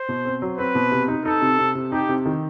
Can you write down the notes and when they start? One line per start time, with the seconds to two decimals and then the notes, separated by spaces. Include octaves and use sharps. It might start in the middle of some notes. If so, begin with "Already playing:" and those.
Already playing: C5
0.09 B2
0.25 C4
0.42 F#3
0.58 C4 B4
0.75 B2
0.92 C3
1.08 D#4
1.25 D#4 A4
1.42 C3
1.59 C3
1.75 C3
1.92 D#4 G4
2.09 C3
2.25 D#3